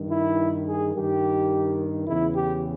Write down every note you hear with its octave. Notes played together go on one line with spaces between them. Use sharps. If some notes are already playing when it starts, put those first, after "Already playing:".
Already playing: G2 D#3
E4
G#4
G2 D#3 G4
E2 C#3 E3 E4
G4